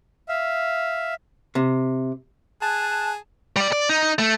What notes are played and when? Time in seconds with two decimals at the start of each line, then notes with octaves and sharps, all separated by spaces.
0.29 E5 F5
1.55 C3
2.62 G#4 A5 F#6
3.56 G3 D5
3.73 D5
3.89 D#4
4.19 A3